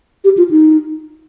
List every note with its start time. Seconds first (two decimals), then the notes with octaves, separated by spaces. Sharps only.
0.24 G4
0.38 F4
0.51 D#4